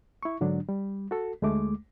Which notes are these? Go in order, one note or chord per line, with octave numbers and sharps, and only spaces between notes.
E4 C#6
G#2 D3 F#3 D4
G3
F#4 A4
D2 G#3 A3 D6